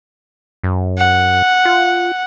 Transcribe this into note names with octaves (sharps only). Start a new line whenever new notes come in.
F#2
F#5
F4